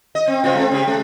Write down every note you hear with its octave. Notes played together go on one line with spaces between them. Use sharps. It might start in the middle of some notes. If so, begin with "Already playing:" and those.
D#5
C4
C#3 B3 F4
G#3 C4
C#3 G4
G#3